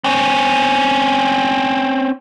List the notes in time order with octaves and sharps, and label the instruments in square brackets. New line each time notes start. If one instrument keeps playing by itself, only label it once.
[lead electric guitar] C4 C#4